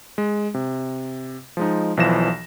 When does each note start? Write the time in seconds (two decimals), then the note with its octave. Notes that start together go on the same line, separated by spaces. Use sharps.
0.18 G#3
0.54 C3
1.57 F3 G#3 D#4
1.97 B1 E3 F3 A#6 E7